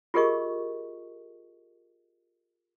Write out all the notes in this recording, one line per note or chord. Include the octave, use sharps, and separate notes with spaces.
F4 G4 G#4 A#4 D#5 C#6